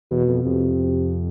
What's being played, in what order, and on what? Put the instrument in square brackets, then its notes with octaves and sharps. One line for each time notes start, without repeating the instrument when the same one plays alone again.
[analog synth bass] E2 [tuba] B2
[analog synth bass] F2
[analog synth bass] F2 [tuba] C3